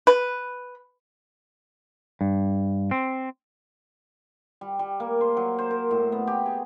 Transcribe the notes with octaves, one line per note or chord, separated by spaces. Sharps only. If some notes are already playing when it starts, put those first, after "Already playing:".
B4
G2
C4
G3
G3
A#3
C5
F#3
C5
A#4
A2
B3
G4
G#4